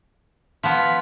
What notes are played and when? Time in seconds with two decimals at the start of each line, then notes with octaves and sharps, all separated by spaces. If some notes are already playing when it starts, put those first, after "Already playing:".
0.63 F3 B3 B6